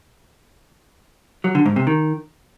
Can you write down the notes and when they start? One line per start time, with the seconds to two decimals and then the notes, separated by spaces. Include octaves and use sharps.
1.44 F#3
1.55 D3
1.66 G#2
1.76 C3
1.87 D#3